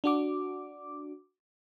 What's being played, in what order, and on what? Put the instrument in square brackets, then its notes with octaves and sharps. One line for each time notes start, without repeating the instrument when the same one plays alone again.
[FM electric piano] D4 F#4 D6